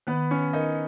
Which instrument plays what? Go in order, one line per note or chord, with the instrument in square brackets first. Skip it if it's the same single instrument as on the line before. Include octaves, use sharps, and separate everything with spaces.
[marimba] D#3 [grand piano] B3 B4
[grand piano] C#4 C#5
[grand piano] D#4 D#5 [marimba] A#4